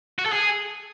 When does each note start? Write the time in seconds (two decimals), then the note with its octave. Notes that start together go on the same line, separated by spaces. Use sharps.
0.19 F#4
0.26 A4
0.33 G#4